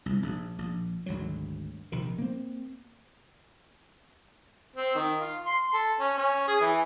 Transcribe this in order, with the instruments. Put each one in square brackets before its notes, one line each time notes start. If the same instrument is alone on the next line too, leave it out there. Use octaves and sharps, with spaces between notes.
[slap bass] C2
A#1
A#1
G#1 D2 F#3
A#1 C3 D#3
A#3 C4
[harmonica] C4
D#3
F4
C6
A4
C#4
C#4
G#4
E3